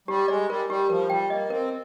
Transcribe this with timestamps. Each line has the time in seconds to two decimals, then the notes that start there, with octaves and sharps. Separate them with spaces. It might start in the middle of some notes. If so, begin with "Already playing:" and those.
0.08 G3 G4
0.28 G#3 D5
0.49 G3 A#4
0.69 G3 G4
0.90 F3 A#4
1.10 G3 G5
1.30 A#3 D#5
1.50 C4 A#4